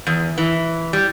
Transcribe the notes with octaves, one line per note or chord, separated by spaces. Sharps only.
E2
E3
G3